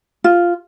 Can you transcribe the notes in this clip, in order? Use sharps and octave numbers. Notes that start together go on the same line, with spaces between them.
F4